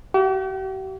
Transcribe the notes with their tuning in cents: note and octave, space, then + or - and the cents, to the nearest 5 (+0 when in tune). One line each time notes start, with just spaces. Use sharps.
G4 -45 F5 -20